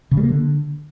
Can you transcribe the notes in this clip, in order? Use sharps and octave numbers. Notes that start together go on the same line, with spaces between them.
C#3
G3
A#3
D3